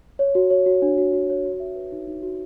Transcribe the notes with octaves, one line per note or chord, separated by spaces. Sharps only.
C#5
F#4
C#5
F#4
D4
F#4
F#4
C#5
F#4
E5
B4
D#4
D#4
F#4